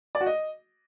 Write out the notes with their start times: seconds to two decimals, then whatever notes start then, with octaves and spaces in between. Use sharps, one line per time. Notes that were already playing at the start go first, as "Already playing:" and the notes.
0.15 D5
0.21 F#4
0.26 D#5